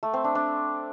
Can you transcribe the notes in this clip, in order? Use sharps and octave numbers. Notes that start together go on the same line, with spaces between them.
A3
C4
D4
D4